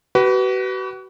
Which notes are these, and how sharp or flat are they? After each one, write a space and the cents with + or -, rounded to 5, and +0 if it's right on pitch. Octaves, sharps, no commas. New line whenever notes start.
F#4 +40 B4 +0